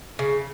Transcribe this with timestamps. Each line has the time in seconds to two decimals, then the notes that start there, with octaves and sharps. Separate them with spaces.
0.19 C#3